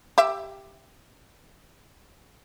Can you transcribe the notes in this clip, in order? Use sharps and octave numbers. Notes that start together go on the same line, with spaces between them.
G4 E5